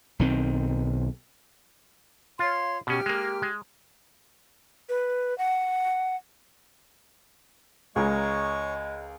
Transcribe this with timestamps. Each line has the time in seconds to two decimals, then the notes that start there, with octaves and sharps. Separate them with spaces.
0.19 B1 D#3 C4
2.39 F4 C#5 F5 C6
2.87 B2 C#4 G4 F6
3.06 G#3 A#3
3.42 G#3
4.89 B4
5.38 F#5
7.96 C#2 G#3 G#4 A#4 C#5 C#6